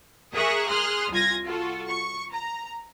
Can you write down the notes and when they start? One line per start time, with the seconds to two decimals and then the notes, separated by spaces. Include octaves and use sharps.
0.34 G#4 A#4 E5 C#6 D#6 F#6
0.68 G#4 C6 D#6 F6 F#6
1.11 C2 F4 G#5 G#6 A#6
1.45 F4 F#4 A4
1.87 C#6
2.31 A#5